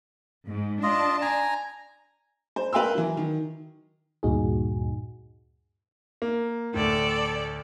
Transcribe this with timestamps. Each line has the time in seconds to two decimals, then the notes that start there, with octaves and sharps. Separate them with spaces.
0.48 G#2
0.83 D4 F4 D#5 A5
1.22 G#5 A#5
2.56 C5
2.73 A#4 B4 F5 G5 C6 E6
2.95 E3 F#3
3.17 D#3
4.23 D2 G2 A#2 D#4 F#4 G#4
6.22 A#3
6.74 D2 A2 A4 D5